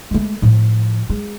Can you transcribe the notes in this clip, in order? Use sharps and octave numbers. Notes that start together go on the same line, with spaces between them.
G#3 A3
A2 F3
G#3